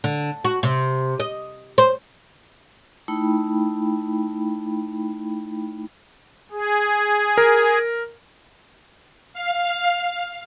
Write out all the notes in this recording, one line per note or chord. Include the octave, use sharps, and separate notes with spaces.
D3
F#4
C3
D#5
C5
A3 D#4 E4 G5 B5
G#4
A#4
F5